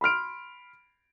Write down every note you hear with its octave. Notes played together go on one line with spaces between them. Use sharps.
B5 C6 F6 D7